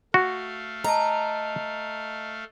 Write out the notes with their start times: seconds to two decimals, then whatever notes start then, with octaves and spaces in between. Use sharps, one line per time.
0.14 A3 F#4 F5
0.84 D#5 A5 A#5